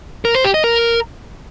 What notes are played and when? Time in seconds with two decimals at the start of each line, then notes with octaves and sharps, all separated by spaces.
0.25 A#4
0.35 C5
0.44 G4
0.54 D#5
0.64 A#4